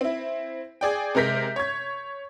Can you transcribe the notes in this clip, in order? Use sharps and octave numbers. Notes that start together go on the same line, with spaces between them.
C4 E4
G#4 D5 G5
C3 G#3 A#4 G6 B6
C#5 G#6